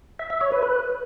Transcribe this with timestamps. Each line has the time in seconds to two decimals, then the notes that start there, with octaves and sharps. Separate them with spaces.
0.19 E5
0.30 E5
0.41 C#5
0.52 B4
0.63 B4